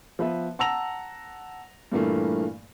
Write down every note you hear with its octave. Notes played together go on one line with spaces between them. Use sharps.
F3 B3 B4 E5
F#5 A5 A#5 E6 A#6 F7
G2 A#2 E3 A3 A#3